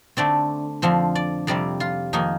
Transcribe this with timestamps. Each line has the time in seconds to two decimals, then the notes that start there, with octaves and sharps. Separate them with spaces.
0.17 D3 A3 C4 D5
0.82 F2 D3 F3 C4
1.15 D5
1.47 F2 C3 G3 C4 D5
1.80 F4
2.13 F2 D#3 A#3 D#4